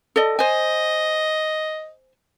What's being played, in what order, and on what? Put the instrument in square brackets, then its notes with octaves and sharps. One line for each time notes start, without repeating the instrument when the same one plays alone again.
[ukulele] A4 D5 D#5
[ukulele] C5 G#5 [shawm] D#5